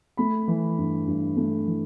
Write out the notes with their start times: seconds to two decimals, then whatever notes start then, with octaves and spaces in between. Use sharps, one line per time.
0.17 A3 B5
0.48 E3
0.78 G2
1.07 G2
1.37 A3
1.67 E3